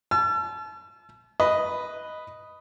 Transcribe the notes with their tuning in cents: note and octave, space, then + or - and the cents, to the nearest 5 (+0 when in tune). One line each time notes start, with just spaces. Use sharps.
A5 -35 E6 +45
B4 +0 D#5 +0